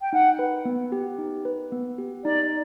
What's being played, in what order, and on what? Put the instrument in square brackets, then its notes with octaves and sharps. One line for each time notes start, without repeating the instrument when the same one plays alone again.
[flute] G5
[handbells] D#4 [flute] F#5
[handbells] B4
B3
G4
D#4
B4
B3
G4
[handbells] D#4 [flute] D5